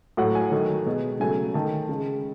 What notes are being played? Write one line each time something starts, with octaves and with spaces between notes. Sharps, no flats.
A2 F#3 A3 F#5
G#5
D#3 F#3 A3
B2 G#3
C#3 F#3 A3 G#5
D#3 A3 A5
C#3 G#3